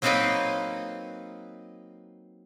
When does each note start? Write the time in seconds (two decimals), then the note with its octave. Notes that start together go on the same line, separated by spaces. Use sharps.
0.02 F#3 A#3 C4 D#4 B4 D#5